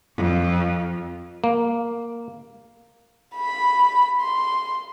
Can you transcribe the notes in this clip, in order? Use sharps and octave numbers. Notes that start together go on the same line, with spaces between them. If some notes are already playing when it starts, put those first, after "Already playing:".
F2
A#3
B5
C6